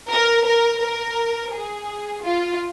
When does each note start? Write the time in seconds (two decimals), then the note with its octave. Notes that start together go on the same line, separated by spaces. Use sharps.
0.10 A#4
0.45 A#4
0.80 A#4
1.52 G#4
2.23 F4